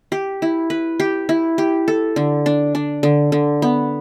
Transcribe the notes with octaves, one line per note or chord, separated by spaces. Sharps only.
G4
E4
B4
G4
E4
G4
A4
D3
D4
D4
D3
D3
B3